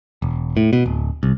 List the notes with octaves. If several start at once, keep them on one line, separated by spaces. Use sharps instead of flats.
E1
A2
B2
D1
C2